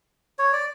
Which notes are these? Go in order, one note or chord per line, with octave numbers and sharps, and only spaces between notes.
C#5
D5